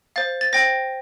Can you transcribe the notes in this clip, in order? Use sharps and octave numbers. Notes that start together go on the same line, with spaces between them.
C5 F5 A6
A6
C5 G5 A#6